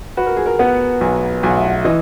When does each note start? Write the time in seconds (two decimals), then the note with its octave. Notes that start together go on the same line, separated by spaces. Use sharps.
0.17 F#4 B4
0.26 A#4
0.37 G#4
0.46 A#4
0.59 B3 F#5
1.01 B1 G#5
1.43 B1 G#5
1.50 F#5
1.57 E5
1.64 F#5
1.85 E3 D#5